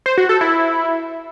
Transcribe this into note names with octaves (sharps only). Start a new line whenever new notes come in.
C5
F#4
A4
E4